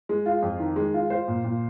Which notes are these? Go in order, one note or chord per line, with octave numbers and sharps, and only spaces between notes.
G#3
F4
F2
D#3
G#3
F4
F4 C5
A#2
A#2